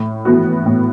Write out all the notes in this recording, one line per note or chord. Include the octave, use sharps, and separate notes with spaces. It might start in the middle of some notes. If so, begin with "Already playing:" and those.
Already playing: A2
E3 B3 F#4
A2